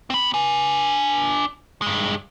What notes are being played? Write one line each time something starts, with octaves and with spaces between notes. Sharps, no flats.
C4 B5
D4 G#5
G2 G#3